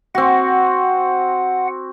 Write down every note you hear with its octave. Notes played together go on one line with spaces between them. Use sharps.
C4 F#4 F#5